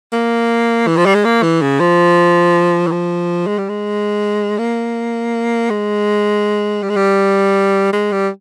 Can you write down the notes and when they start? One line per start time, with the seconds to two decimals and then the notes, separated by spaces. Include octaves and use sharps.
0.13 A#3
0.88 E3
0.97 F3
1.06 G3
1.15 G#3
1.25 A#3
1.43 E3
1.62 C#3
1.80 F3
2.87 E3
2.92 F3
3.47 G#3
3.59 G3
3.69 G#3
4.59 A#3
5.70 G#3
6.83 G3
6.90 G#3
6.96 G3
7.93 G#3
8.12 G3